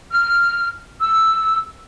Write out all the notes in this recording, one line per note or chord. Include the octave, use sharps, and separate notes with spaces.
F6
E6